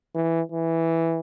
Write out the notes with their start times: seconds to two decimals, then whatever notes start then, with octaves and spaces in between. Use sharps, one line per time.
0.15 E3
0.52 E3